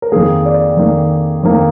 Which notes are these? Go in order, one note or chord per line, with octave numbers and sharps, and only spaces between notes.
A#4
F2 D#3 A#3 G#4
D5
F2 D#3 A#3
F2 D#3 A#3